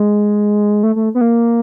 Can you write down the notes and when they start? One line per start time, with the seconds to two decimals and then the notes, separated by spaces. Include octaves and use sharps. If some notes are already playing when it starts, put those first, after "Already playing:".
Already playing: G#3
0.83 A3
0.96 A3
1.15 B3
1.21 A#3